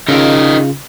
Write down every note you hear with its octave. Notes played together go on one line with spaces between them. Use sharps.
C#3 D#4 F4 A4 A#4